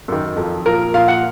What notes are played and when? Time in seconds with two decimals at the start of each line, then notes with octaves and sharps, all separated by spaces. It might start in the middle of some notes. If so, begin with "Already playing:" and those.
0.08 F#2 D#3
0.37 F2 F3
0.66 A#2 F3 A#4
0.94 A#2 F3 F5
1.08 F#5